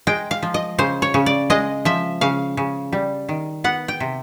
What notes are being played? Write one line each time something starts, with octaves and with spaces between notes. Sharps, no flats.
G#3 G5
F5
F3
D#5
C#3 C5
C#5
C#3
D5
G#3 D#5
F3 E5
C#3 F5
C#3
G3
D#3
B3 F#5
G5
C3